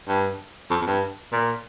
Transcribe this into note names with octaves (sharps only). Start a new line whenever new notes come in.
G2
F2
F2
G2
A#2